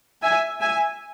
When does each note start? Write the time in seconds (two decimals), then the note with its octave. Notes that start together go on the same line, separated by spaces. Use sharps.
0.23 E5 G#5
0.61 E5 G#5